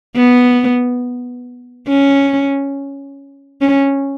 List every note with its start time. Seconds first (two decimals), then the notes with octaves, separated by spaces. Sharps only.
0.16 B3
1.88 C#4
3.61 C#4